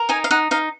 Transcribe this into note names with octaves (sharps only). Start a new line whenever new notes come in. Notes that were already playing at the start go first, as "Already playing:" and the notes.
Already playing: A#4
D#4 G#5
F5
D#4 F#5
D#4 F5